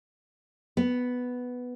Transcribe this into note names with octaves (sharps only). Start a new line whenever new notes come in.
B3